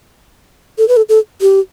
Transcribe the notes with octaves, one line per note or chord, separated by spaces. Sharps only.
A4
B4
A4
A4
G4